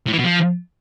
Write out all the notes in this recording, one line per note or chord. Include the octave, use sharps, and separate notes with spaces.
A2
E3
B2
F3